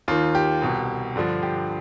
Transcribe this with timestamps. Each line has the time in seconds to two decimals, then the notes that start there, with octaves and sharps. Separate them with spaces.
0.08 D#2 D#3 F4
0.35 G4
0.62 C2 B2
1.16 G2 D3 F3
1.43 G4